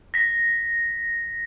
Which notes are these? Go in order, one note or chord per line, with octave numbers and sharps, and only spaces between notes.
A#6 B6